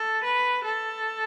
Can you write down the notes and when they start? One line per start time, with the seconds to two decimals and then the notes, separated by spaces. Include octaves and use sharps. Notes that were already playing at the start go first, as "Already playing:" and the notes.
Already playing: A4
0.24 B4
0.64 A4